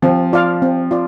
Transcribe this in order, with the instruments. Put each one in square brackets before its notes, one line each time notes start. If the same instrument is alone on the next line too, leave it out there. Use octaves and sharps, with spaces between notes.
[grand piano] F3 [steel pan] C4
[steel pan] F4 D5 F5
C4
F4 D5